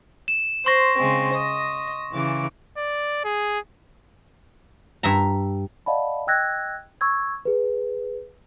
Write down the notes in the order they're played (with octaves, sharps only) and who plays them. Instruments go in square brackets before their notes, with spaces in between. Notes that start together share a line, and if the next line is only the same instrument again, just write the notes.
[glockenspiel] E7
[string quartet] C5 [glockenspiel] C6 C#6 A#6
[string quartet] C#3 G#3 C4
D#5
C#3 E3 D6
[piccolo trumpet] D5
G#4
[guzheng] G2 E5 A#5
[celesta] D5 D#5 F5 F#5 A5 B5
D#5 G5 E6 F#6 G#6 A#6
C#6 E6 G#6
G#4 B4